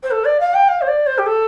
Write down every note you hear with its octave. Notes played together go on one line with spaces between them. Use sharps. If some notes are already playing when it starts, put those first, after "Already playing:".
C5
A4
D5
F5
G5
F5
C5
D5
C5
G4
A4